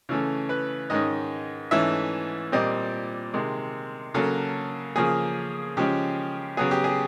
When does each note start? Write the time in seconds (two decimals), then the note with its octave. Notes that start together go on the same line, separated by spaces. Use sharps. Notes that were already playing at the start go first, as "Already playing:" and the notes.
0.09 C#3 E3 A3 C#4
0.49 B4
0.90 G#2 D#3 G#3 C#4 D#5
1.71 G#2 E3 A3 C#4 E5
2.52 A#2 G3 C4 D#5
3.34 C3 D#3 G#3
4.14 C#3 F#3 A#3 A4
4.96 C#3 F3 A#3 C#4 G#4
5.77 C#3 F3 G#3 C#4 G4
6.57 C#3 F#3 B3 G#4
6.71 G4
6.84 G#4